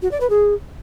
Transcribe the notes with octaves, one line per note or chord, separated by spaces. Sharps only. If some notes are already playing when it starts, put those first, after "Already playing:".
F#4
D5
B4
G#4